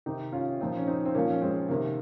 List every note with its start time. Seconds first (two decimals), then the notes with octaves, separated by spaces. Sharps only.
0.06 C3 D#3 D#4 G4
0.32 C#4 F4
0.60 A#2 F3 C4 D#4
0.77 C#4
0.87 C4 D#4
1.05 C4
1.15 A#2 F3 A#3 C#4
1.30 C#4
1.41 G#3 C4
1.69 C3 D#3 A#3